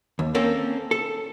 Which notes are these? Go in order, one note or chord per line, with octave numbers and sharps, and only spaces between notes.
D#2
A#3 C4 C#4 A4
A4